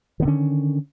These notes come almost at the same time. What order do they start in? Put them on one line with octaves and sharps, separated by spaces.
D#3 B3 D3 C#4